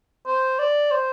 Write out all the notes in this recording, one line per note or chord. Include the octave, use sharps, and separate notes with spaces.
C5
D5
C5